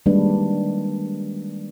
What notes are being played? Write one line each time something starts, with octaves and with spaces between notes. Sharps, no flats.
D#3 G3 G#3 A#3 D4 B4